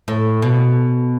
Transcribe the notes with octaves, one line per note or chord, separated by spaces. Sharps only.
A2
B2